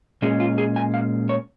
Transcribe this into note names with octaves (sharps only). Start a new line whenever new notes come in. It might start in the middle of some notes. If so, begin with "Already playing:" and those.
A#2 G#3 C#4 G#4
F4
G#4
G#5
F5
C#5